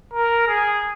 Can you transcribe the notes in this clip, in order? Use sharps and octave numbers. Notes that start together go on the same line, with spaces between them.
A#4
G#4